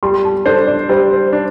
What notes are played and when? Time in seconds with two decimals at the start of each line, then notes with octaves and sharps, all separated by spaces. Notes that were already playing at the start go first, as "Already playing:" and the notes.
0.03 G3 C6
0.24 A5
0.46 D4 A4 C5
0.67 D5
0.89 G3 C5
1.33 D4